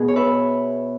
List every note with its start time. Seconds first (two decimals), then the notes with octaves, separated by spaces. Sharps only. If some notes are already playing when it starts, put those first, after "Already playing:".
Already playing: B2 B3 G#4
0.08 C#5
0.16 B4 E5